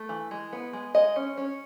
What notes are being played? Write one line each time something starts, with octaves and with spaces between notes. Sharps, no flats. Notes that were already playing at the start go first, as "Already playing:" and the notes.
Already playing: A3
E3
G#3
B3
G#3
G#3 D#5
C#4
C#4